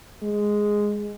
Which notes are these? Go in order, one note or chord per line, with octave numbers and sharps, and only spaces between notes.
G#3